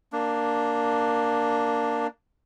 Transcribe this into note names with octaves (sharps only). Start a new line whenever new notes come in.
A#3 D4